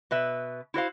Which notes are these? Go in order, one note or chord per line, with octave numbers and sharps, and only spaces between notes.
B2 B4 E5
E4 F#4 C5 F5